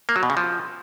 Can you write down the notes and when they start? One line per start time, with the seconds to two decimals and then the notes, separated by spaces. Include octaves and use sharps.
0.09 A#3
0.16 F#3
0.23 B2
0.30 C#3
0.37 F3